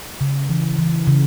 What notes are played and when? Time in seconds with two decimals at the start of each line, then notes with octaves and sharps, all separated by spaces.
0.21 C#3
0.49 E3
0.79 E3
1.07 C#3